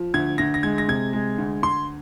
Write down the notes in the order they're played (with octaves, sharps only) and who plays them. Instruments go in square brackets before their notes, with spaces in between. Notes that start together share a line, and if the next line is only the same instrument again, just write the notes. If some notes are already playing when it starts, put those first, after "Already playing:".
Already playing: [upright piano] F3
[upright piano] D2 [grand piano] G#6
[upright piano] D2 [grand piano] A#6
[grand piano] A#6
[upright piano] G#3 [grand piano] G#6
[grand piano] A#6
[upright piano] C3 [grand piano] G#6
[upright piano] G#3
D2
[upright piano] D2 [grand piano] C6